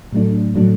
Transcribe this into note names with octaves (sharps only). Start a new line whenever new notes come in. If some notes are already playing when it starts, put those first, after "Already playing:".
A2 F#3 A3 D4
A2 F#3 A3 D4